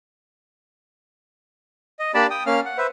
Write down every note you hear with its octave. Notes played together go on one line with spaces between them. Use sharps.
D#5
A#3 D4 G4 D5 A5 B5
G5 D#6
A#3 C#4 F5 F6
F#5
B4 C5 E5